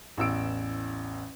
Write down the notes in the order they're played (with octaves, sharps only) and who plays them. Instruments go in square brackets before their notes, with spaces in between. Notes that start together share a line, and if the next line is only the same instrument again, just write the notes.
[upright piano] A1 E2 E6 D7